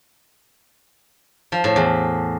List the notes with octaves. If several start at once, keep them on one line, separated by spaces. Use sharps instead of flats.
F3
A2
E2